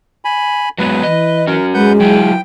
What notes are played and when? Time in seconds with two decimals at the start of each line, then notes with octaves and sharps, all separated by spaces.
0.25 G#5 B5
0.78 F#3 G#3 B3 B4
1.03 E3 D#5
1.47 C#4 F#4 A#4
1.74 G#3 B4 F#5 G6
2.00 F#3 E4 F4 G5